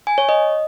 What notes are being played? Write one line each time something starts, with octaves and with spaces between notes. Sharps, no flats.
G#5
C#5
D#5